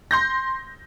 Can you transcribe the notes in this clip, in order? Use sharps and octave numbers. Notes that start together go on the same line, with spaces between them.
C6 G6 A#6